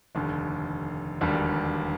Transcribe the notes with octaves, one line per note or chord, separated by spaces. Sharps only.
F1 D#2 D3
E1 D#2 D3 G3 A#3